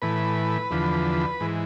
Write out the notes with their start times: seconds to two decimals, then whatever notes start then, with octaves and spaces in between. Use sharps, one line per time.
0.02 A2 E3 B4
0.71 E2 D3 F3
1.40 G#2 E3